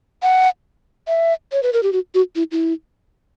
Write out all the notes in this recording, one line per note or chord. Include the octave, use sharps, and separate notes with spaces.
F#5
E5
C#5
B4
A#4
G4
F#4
F#4
E4
E4